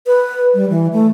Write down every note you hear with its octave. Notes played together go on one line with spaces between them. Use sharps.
B4
G3
E3
A3